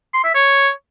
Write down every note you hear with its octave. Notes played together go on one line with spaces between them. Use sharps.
C6
E5
C#5